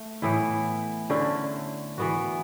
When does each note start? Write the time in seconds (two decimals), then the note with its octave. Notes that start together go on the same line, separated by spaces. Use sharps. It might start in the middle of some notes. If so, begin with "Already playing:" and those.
Already playing: A3
0.22 A2 E3 B3 E4
1.10 D3 A3 C#4 E4
1.98 E3 B3 F#4